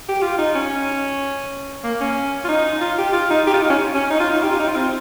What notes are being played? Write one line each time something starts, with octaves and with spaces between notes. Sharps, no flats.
G4
F4
D#4
C#4
A#3
C#4
F4
D#4
F4
G4
F4
D#4
G4
F4
D#4
C#4
C#4
D#4
F4
D#4
G4
F4
D#4
F4
C4